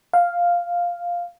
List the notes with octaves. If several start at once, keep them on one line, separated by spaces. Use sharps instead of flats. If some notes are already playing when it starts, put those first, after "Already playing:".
F5